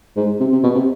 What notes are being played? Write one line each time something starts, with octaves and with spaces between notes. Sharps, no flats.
G#2
C3
C3
B2
C3